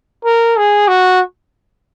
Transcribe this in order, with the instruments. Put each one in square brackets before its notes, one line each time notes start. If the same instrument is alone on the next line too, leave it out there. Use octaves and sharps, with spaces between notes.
[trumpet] A#4
G#4
F#4